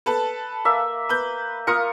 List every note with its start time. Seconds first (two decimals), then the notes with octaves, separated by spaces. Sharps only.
0.06 A4 B4 A5
0.65 A#3 E5
1.09 B4 G6
1.67 F4 A#4 F5 D#6 C#7